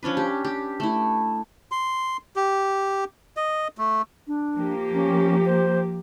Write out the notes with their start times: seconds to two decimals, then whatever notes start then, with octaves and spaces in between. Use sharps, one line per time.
0.03 F3 C#4 D4 B4
0.17 G4
0.45 G4
0.80 A3 E4
1.72 C6
2.36 G4
3.37 D#5
3.78 A3
4.27 D4
4.56 F3 A#3 G4
4.94 C#4
5.46 C5